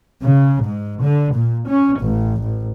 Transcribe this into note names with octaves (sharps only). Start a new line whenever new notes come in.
C#3
G#2
D3
A#2
C#4
A1
A1